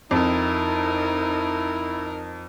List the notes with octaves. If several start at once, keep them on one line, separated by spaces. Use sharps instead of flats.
F2 D#4 E4 A#4